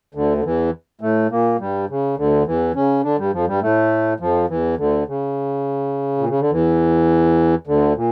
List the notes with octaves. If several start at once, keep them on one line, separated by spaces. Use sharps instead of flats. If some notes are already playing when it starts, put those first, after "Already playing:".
D2 D3
D3
E2 E3
A2 A3
A#2 A#3
G2 G3
C#3
D2 D3
E2 E3
C#3 C#4
D3 D4
G2 G3
F2 F3
G2 G3
A2 A3
F2 F3
E2 E3
D2 D3
C#3
A#2
C#3
D3
E2 E3
D2 D3
A#2